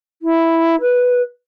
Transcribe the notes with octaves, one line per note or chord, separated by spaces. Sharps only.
E4
B4